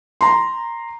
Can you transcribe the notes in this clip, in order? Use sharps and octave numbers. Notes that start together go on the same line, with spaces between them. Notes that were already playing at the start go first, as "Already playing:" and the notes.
A#5 C6